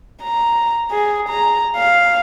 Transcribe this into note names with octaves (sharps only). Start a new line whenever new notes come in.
A#5
G#4
A#5
F5